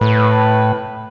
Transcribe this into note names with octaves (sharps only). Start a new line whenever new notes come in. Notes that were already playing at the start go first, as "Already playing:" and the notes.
A2 B4